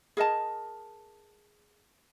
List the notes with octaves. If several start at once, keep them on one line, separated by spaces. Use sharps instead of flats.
G#4 A#4 D#5 A5